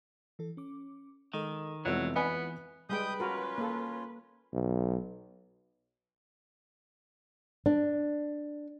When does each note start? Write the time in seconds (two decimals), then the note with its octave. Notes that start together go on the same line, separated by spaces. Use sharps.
0.39 E3 A4
0.57 C#4 D6
1.33 D#3 G#3 A4 D#5
1.85 F1 E2 F#3 G#3 E4 F4 E6
2.16 B3 F#5 G#5 B5
2.90 G3 G#3 B4 G5 D#6 G6
3.20 C#4 F4 F#4 A#4
3.58 A#3 A4
4.53 B1
7.66 D4